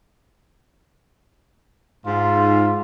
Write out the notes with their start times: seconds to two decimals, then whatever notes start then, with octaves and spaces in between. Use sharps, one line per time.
2.06 G#2 F4